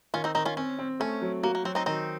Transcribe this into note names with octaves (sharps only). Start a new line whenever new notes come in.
D#3 C#4 F4
C4 D#4
D#3 C4 D#4
C#4 F4
C4 C#4
C4
A3 C#4
F#3
A#3 F#4
A#3
F#3 C4
C4 D#4
D#3 C4 D#4